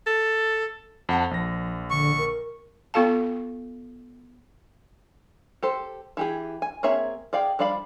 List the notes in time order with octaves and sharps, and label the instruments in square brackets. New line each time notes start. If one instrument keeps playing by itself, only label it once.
[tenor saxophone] A4
[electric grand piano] F2 F#5 A5
[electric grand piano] A#1 A#6 [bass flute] F3
[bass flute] D3 [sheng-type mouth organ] C#6
[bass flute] A#4
[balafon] B3 F4 A4 F5 A5
[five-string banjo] G4 A4 C5
E3 G4 G#4
G#5
A#3 C4 G#4 C#5 E5
G#4 D5 F5 G5
F3 G3 D5 F5 B5